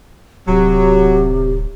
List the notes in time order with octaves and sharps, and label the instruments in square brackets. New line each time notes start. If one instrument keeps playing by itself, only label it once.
[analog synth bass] D1 [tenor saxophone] C3 [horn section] F#3 [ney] G4